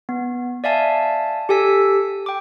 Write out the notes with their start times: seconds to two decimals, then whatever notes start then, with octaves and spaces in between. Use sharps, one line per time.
0.09 B3
0.64 D5 E5 F5 G#5 A5
1.49 G4 A4 G#5 E6 B6
2.26 G5 D6